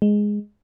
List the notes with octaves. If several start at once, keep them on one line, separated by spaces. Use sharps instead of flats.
G#3